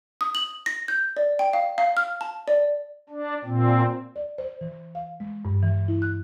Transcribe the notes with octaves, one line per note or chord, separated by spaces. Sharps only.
D#6
F#7
A#6
G6
D5
G5
F5
F5
F6
A5
D5
D4
A#2 C4
D5
C5
E3
F5
G#3
G2
E3
E4
F#6